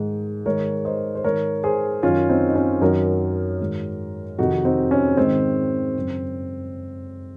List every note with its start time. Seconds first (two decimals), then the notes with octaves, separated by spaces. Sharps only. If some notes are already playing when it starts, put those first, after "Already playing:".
Already playing: G#2 D#3
0.46 G#2 D#3 A#4 C#5
0.85 C5 D#5
1.15 C5
1.24 G#2 D#3 A#4 C#5
1.64 G#4 C5
2.03 F#2 D#3 C#4 F4
2.29 C4 D#4
2.48 D#4
2.55 C#4 F4
2.81 F#2 D#3 F#4 A#4
3.60 G#2 D#3
4.38 F2 C3 D#3 D#4 F#4
4.65 C4 D#4
4.91 C#4
5.17 G#2 D#3 C4
5.96 F#2 C#3